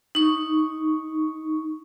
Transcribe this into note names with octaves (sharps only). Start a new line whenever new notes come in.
D#4 C#6